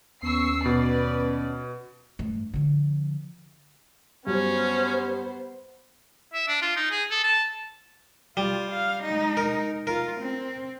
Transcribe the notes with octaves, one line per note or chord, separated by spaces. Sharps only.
D#2 B3 C#4 C#6 E6 C7
B2 B4 D5
G2 A3
D3 F3
G2 F#3 B3 C#4 C5
E5
D4
F4
D#4
G#4
A4
A5
G3 F4
F5
G#3 D#4
A#4
F4 A#4
C4